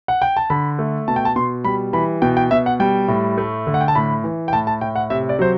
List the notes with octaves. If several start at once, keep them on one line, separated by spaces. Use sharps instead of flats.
F#5
G5
A5
D3 B5
A3
B2 A5
G5
A5
B2 C6
G3 B5
E3 B5
B2 G5
G5
B2 E5
F#5
G3 G5
A2
A3
D3
F#5
G5
A5
A2 B5
E3
G5
A2 A5
A5
A2 G5
F#5
C3 E5
D5
F#3 C5